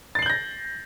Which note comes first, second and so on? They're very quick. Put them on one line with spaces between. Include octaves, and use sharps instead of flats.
A6 C7 F#7 G6 A#6